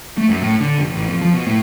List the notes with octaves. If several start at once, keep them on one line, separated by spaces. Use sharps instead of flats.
A3
F#2
A2
D3
F1
A1
F2
F3
B2
A2